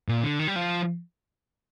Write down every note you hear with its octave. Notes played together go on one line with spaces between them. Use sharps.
A#2
D3
D#3
G3
F3